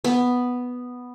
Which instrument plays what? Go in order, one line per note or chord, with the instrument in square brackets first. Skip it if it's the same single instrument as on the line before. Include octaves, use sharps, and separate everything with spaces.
[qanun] B3